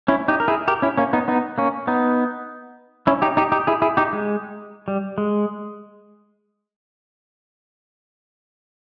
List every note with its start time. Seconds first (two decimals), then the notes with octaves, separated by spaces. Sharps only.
0.08 C#4 E4
0.28 D#4 G4
0.40 A#4
0.48 E4 G#4
0.68 G4 A#4
0.82 C#4 E4
0.97 A#3 C#4
1.13 B3 D#4
1.28 B3 D#4
1.58 A#3 C#4
1.87 B3 D#4
3.07 C#4 E4
3.22 D#4 G4
3.37 D#4 G4
3.52 D#4 G4
3.67 E4 G#4
3.82 E4 G#4
3.97 D#4 G4
4.13 G#3
4.88 G3
5.18 G#3